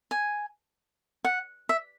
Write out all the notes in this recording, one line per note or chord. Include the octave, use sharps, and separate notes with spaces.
G#5
F#5
E5